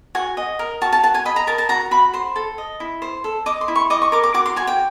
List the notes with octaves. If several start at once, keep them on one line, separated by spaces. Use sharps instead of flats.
F#4 G#5
D#5
A#4
F#4 A5
A5
F#4 A5
G#5
D#5 B5
A#5
A#4 A5
A5
F#4 A#5
F#4 B5
C5 C6
A4
D#5
E4
C5
A4
D#5 D6
C6
E4
C#6
D#5 D6
C#6
A#4 D6
D6
F#4 D6
C6
F#4 G#5
G5